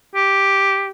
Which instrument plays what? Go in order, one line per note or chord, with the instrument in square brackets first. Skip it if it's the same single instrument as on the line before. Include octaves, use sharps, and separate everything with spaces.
[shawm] G4